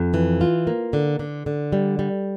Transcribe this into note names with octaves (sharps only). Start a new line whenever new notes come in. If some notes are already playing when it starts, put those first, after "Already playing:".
Already playing: F2
E3
F4
A#3
D3
D3
D3
G3
G3